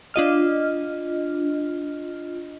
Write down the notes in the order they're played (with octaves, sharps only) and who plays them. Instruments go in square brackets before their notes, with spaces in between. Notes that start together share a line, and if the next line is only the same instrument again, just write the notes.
[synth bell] D4 F4 D#5 F6